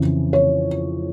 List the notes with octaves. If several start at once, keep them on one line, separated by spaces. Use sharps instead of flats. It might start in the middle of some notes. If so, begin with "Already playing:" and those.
Already playing: F2 C#3 E3
C#5